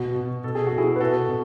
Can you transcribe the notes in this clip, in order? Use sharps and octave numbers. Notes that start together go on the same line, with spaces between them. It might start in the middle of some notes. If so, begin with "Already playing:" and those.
Already playing: B2 F#4
B2
B2 A4
G#4
F#4
B2
E4 G#4
B4
B2 F#4 A4
B2